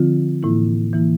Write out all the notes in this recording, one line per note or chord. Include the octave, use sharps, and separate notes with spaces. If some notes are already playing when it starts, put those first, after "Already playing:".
Already playing: D3 F3 C4 F4
A2 E3 A#3 E4
E3 A#3 E4